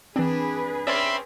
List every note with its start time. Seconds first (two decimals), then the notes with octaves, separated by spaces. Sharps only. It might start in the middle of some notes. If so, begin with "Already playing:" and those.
0.16 E3 C4 D4 G#4 B4
0.87 C4 C#4 D5 E5 B5 C6